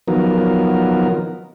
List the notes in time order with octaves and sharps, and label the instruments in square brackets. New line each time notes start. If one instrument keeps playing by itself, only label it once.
[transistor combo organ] D#3 F3 F#3 B3 A#4